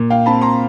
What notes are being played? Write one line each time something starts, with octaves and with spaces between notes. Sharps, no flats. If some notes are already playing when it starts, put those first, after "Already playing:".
Already playing: A#2
F5 G5
C4 A5 B5
A#5 C6